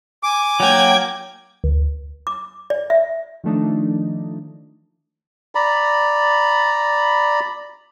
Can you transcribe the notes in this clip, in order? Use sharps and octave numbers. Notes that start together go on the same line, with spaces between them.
G#5 D6
F#3 A#3 G5 G#6
D2
D6
D5
E5
D#3 F3 A3 D4 D#4
D5 A#5 B5